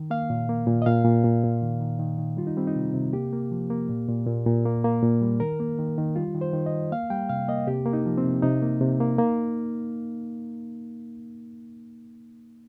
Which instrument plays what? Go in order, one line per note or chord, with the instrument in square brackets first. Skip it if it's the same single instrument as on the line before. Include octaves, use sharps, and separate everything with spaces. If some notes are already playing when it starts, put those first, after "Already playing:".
Already playing: [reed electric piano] D#3
A#3 F5
A#2
A#3
A#2
D#5
A#2 F5
A#2
A#2
A#2
D#3
D#3
D#3
D#3
G3 F4
D#4
G3 C4
D#4
C3
C3
A#3 G4
A#3
F3
A#3
A#2
A#2
A#2
A#2
A#3
A#3
A#2
G3
D#3 A#4
A#3
D#3
D#3
G3 F4
D#3
C5
D#3
D#5
D#3
A#3 F5
G3 G5
C3 F5
A#3 D#5
C3 G4
A#3
D#4
F3
C4
C3
C3 D#4
A#3
C3
A#3
A#3